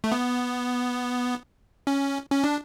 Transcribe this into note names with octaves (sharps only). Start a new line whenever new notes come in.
A3
B3
C#4
C#4
D4